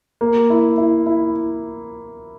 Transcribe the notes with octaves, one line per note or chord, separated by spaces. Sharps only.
A#3
E4
E4
E4